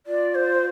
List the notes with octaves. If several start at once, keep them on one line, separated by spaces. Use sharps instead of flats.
F4 D5
C5